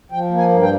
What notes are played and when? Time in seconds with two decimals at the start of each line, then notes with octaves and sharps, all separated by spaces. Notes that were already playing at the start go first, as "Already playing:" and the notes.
0.12 F3 G5
0.31 A#3
0.37 G#5
0.49 G2
0.62 G5